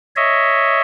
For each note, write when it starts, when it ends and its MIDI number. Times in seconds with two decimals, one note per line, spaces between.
0.16 0.82 73
0.16 0.82 75
0.16 0.82 76